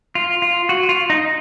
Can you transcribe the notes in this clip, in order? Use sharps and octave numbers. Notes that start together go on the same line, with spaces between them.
F4
F4
F#4
F4
D#4